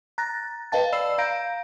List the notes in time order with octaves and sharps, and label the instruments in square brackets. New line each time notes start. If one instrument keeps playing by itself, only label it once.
[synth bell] A#5 F#6 A6 A#6
B4 D#5 F5 G5 A5 A6
D5 B5 E6 C7 E7
F5 A#5 G6 A#6 D7